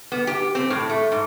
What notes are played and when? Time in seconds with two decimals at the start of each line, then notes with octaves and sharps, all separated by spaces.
0.12 B3
0.27 G4
0.55 C4
0.70 A2
0.90 A3
1.12 G#2